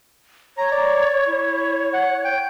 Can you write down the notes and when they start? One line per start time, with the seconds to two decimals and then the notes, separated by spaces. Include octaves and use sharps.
0.58 C#5 A#5
0.72 D5
1.28 E4
1.94 F#5
2.25 G5